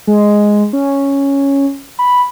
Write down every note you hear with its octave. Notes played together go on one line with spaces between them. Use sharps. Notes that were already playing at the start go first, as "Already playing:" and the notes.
G#3
C#4
B5